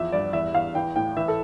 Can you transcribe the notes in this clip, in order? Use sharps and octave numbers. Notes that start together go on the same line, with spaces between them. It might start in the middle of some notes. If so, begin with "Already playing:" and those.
Already playing: E2 F3 E5
G2 D5
E2 E5
E2 F5
E3 G5
A2 G5
E3 E5
A4